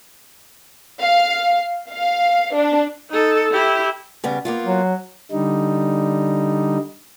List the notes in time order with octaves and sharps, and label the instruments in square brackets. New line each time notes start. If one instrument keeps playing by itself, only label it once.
[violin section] F5
F5
D4
[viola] D#4 A4
E4 G4
[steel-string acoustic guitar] C#3 G3 B3
A#3 B3 F4
[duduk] F#3
[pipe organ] D3 G3 D#4